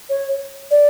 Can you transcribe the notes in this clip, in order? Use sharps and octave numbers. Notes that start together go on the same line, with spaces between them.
C#5
D5